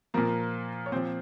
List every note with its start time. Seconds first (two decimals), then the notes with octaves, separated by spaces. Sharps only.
0.14 A#2 F3 A#3 A#4
0.86 C#5
0.92 A#2 F3 C4 C5